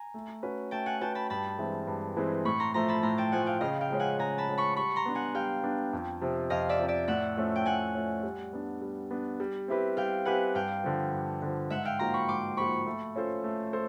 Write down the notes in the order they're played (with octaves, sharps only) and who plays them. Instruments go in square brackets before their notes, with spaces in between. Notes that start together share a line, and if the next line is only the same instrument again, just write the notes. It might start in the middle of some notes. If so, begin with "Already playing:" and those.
Already playing: [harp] G#5 A#5
[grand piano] A3
C#4 F#4 B4
[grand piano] A3 [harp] G5 A5
[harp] F#5 G#5
[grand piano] C#4 F#4 B4 [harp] G5 A5
[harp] A5 B5
[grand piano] G2 [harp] A5 B5
[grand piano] E3 G#3 C4 E4
G2
E3 G#3 C4 E4
[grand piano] A2 [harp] B5 C#6
[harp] A#5 C6
[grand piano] F3 A3 [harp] A#5 C6
[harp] A5 B5
[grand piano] A2 [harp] A#5 C6
[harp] G5 A5
[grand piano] F3 A3 [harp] F#5 G#5
[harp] F5 G5
[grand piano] C#3 [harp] D#5 F5
[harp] F5 G5
[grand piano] F3 G#3 C#4
[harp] F#5 G#5
[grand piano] C#3 [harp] G#5 A#5
[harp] A5 B5
[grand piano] F3 G#3 C#4
[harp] B5 C#6
[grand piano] G3 [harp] B5 C#6
[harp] A#5 C6
[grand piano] B3 D4
[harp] F#5 G#5
[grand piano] G3 [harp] F5 G5
[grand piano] B3 D4
F2
C3 F3
[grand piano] F2 [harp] D#5 F5
[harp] D5 E5
[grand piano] C3 F3
[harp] D5 E5
[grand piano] A2 [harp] E5 F#5
[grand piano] F3 A3 C#4
[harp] G5
[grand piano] A2 [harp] F#5 G#5
[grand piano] F3 A3 C#4
G3
B3 D4
G3
B3 D4
G3
C4 E4 G4 B4
[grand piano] G3 [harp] F5 G5
[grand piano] C4 E4 G4 B4 [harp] F#5 G#5
[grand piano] G2 [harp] F5 G5
[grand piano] D3 F3
G2
D3 F3
[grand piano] G#2 [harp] E5 F#5
[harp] F5 G5
[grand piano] F3 A#3 D#4 F#4 [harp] A#5 C6
[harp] B5 C#6
[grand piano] G#2 [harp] C6 D6
[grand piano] F3 A#3 D#4 F#4 [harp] B5 C#6
[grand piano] A3
C#4 F4 A4 C5
A3
A4 C5